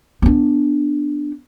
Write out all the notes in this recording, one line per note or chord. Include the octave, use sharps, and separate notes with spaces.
B3 D4